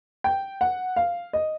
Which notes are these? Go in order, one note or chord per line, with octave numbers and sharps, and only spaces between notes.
G5
F#5
F5
D#5